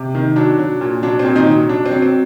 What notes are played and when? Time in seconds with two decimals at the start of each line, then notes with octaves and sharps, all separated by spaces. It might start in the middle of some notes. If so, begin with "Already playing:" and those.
Already playing: C3
0.15 D#3
0.36 F#3 D4
0.59 F#3
0.81 A#2
1.03 F#3 D4
1.19 C4
1.25 A#2
1.36 D#3 D#4
1.46 F#3
1.69 F#3 D4
1.86 C4
1.91 F#3
2.02 C4